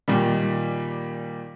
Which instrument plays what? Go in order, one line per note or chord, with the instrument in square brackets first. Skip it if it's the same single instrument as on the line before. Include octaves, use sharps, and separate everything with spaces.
[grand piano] A#2 D#3 G3